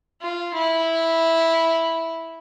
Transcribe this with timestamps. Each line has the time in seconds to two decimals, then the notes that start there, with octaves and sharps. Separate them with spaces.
0.21 F4
0.54 E4